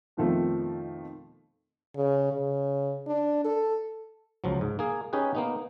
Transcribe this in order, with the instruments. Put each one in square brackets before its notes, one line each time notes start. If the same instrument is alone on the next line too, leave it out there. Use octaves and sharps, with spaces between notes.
[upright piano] F2 B2 D#3 F3 A3
[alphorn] C#3
C#3
D4
A4
[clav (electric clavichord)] C#2 F3 F#3
G#2
A#3 G#4
C#4 D#4 G4 G#4 B4
A#3 B3 D#4